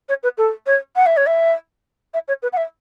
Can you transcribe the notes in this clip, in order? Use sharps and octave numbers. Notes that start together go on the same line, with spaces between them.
C#5
B4
A4
C#5
F#5
E5
C#5
E5
E5
C#5
B4
F#5
E5